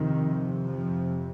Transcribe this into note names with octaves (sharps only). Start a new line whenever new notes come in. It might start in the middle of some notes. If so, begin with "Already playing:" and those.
Already playing: F2 C3 D#3
F3